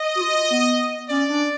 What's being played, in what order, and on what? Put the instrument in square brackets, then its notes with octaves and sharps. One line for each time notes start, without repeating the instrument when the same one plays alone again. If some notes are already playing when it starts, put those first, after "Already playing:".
Already playing: [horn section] D#5
[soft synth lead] F#4
F4
B3
[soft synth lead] C#4 [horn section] D5
[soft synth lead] D4